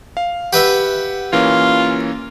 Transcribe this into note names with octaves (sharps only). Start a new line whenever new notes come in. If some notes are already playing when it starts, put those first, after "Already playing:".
F5
G4 B4 E5 F#5
E3 A#3 C#4 F4